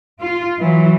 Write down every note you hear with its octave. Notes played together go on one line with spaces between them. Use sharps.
F4
E3 F#3